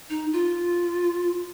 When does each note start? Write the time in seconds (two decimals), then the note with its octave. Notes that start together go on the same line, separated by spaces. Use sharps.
0.10 D#4
0.33 F4